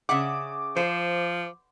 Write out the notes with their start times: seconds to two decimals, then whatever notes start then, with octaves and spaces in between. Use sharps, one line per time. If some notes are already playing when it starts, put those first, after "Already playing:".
0.09 C#3 E5 F#5 D6
0.76 F3 C5